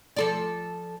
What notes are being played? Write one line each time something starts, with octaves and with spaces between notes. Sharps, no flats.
F3 A4 D5